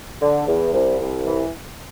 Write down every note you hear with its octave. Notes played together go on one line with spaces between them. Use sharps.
D3
E2
C2
C2
E3